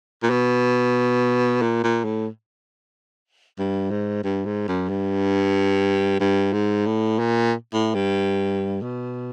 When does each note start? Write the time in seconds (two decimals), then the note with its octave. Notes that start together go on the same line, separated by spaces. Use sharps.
0.23 A#2
0.30 B2
1.62 A#2
1.84 A#2
2.05 A2
3.59 G2
3.91 G#2
4.24 G2
4.46 G#2
4.68 F#2
4.89 G2
6.20 G2
6.53 G#2
6.86 A2
7.19 A#2
7.73 A2
7.95 G2
8.82 B2